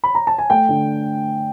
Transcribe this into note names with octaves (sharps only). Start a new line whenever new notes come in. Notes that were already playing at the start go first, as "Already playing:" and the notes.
B5
A#5
A5
G#5
A3 G5
D3